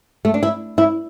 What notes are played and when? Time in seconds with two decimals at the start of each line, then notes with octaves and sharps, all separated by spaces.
0.25 A3
0.34 D4
0.43 E4
0.78 E4